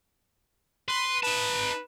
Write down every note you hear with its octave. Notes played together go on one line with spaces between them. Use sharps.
B4 C6
D#4 B4 A5